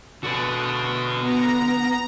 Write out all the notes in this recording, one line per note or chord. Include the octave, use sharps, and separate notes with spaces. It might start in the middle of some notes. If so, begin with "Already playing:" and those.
D3 D4 F#4 G#4 B4
B3 A#5